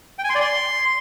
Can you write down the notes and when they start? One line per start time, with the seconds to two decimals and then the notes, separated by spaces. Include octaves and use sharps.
0.19 G5
0.24 G#5
0.30 C6
0.35 D5
0.41 C6